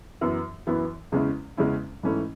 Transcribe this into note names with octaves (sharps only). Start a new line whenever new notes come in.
F#2 E3 B3 E4
F#2 E3 B3 E4
E2 C#3 G#3 C#4 E4
E2 C#3 G#3 C#4 E4
G#2 E3 A3 C#4 E4